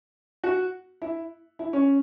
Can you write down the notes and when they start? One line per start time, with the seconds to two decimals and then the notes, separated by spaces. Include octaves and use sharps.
0.44 F#4
1.02 E4
1.59 E4
1.73 C#4